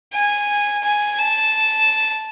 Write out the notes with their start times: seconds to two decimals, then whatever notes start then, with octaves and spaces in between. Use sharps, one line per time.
0.14 G#5
0.84 G#5
1.19 A5